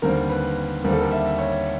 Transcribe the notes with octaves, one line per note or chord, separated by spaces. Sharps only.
D#2 D3 G3 C4 A#4
B4
D#2 D3 G3 C4 A#4
A4
A#4
E5
C#5